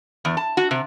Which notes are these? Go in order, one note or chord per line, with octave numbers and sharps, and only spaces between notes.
E2
A5
F#4
C3